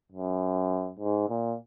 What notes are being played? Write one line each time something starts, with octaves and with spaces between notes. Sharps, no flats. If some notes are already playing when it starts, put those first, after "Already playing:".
F#2
G#2
A#2